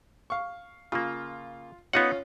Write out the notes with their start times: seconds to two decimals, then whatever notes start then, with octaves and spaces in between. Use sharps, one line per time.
0.30 F5 C#6
0.92 C#3 A#3 F4
1.93 B3 C#4 D#4 F4 F#5